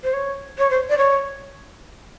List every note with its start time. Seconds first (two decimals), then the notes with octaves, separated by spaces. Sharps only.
0.04 C5
0.13 C#5
0.58 C#5
0.70 C5
0.90 D5
0.98 C#5